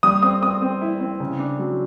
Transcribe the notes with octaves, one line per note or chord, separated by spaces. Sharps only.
G3 D#6
C4 D#6
C4 D#6
C4
E4
C4
C#3
D4
F#3